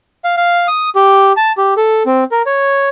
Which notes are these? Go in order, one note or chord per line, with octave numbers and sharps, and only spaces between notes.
F5
F5
D#6
G4
A5
G4
A4
C4
A#4
C#5